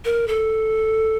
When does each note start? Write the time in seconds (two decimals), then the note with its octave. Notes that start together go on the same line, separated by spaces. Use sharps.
0.05 A#4
0.28 A4